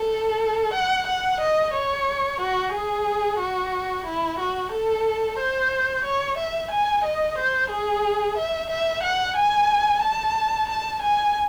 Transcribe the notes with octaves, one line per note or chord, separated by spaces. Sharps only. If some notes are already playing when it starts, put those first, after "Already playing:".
Already playing: A4
F#5
F#5
D#5
C#5
F#4
G#4
F#4
E4
F#4
A4
C5
C#5
E5
G#5
D#5
C5
G#4
E5
E5
F#5
G#5
A5
A5
G#5